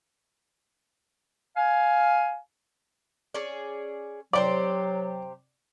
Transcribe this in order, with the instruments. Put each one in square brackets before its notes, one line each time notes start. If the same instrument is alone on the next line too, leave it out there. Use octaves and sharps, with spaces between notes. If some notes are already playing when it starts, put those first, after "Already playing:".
[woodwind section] F5 G#5
[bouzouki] C#4 G#4 D5
[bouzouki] C3 G4 C5 [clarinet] F#3 [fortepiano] D5